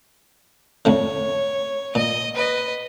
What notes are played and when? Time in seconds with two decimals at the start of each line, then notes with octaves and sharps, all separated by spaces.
0.85 F2 A2 D3 C#5
1.95 A#2 D#5
2.34 B4 D#5